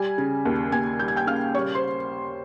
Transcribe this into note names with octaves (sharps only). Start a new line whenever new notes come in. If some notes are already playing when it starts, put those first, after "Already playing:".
Already playing: G3 G#5 G#6
C#3
D#2
D#2 G#5 G#6
G3 G6
G#6
G5 G6
C#3 F5 F6
G3 C#5 C#6
C5 C6